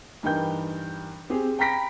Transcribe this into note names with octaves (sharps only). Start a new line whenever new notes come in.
G2 E3 D#4 A#4 G5 G6
C4 G4 G#4
G5 A#5 B5 A#6 B6 D7